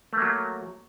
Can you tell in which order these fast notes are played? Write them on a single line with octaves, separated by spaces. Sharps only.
A3 A#3 F#3